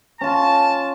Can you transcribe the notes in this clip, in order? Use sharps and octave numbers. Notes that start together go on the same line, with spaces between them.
C#4 F4 A5